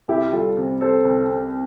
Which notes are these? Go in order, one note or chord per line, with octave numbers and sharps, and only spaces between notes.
C2 E4 G4
G3 F4 A4
C3
G3 A4 C5
C2
C3